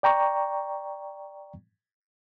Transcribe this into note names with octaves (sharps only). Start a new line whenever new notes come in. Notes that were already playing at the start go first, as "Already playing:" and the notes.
D5 G5 A#5 C#6